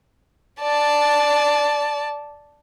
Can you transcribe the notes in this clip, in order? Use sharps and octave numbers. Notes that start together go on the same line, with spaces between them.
D5 A5